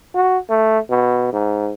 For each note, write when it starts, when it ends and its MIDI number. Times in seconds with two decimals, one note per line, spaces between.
0.15 0.38 66
0.49 0.79 57
0.90 1.32 47
1.32 1.73 44